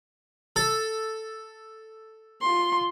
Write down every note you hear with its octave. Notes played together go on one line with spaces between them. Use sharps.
A4
F4 C6